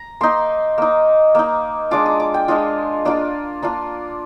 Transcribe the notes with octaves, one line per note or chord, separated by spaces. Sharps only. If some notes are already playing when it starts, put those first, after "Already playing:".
Already playing: A#5
A#3 D#4 C6
A#3 D#4
A#3 D#4
G#3 D4 F4 D6
D#6
D6
G5
G#3 D4 F4 D#5
A#3 D4 F4 D5
A#3 D4 F4